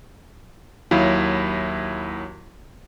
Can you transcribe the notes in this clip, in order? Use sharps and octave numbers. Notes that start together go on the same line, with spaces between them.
D#2 F#3 E4 F5